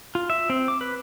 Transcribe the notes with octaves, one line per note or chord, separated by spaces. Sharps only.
F4
E5
C4
D6
B4